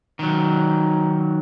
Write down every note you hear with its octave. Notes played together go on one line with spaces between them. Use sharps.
D#3 F#3